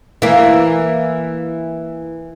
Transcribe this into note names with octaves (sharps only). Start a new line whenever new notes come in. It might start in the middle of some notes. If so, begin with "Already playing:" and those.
E3 A#3